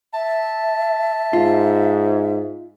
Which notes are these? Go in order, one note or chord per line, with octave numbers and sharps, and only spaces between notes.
E5 A5
G#2 F4